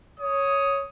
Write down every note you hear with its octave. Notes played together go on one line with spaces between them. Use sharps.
C#5 D#6